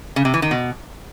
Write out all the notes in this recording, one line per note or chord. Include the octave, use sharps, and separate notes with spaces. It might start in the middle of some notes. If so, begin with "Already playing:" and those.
C#3
C3
E3
D#3
B2